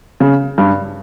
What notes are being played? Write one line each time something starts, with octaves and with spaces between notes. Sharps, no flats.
C#3
G2